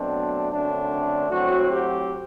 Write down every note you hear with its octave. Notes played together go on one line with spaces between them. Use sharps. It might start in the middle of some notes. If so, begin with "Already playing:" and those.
Already playing: B2 F#3 A3 C4 D4
F#2 D3 A3 C4 D4
A2 F#3 C4 F#4
G4